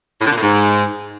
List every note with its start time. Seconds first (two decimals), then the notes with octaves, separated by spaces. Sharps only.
0.21 A2
0.26 D3
0.32 A#2
0.37 A2
0.43 G#2